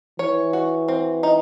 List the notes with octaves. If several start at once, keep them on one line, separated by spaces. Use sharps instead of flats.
E3 C#5
F#4
C4
D#4